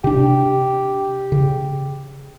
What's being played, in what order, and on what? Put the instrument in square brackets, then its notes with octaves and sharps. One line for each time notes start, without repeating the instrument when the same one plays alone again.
[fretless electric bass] C3 D4 [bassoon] G4
[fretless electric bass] C#3